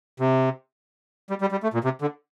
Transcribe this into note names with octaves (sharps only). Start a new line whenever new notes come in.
C3
G3
G3
G3
A3
A#2
C3
D3